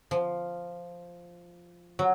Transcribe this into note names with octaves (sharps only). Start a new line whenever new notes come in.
F3
F#3